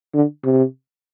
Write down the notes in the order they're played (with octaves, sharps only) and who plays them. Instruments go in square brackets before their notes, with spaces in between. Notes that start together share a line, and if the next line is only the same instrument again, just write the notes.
[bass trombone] D3
C3